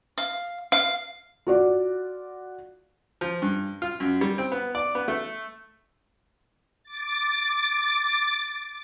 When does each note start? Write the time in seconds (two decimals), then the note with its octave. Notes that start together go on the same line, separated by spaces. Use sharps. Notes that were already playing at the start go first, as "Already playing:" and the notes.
0.18 F5
0.72 F5
1.47 F4 F#4 D5
3.21 F3
3.42 G2
3.82 F4
4.00 F#2
4.21 G3
4.38 C4
4.52 B3
4.75 D5
4.95 B3
5.08 A3
6.83 D6 A6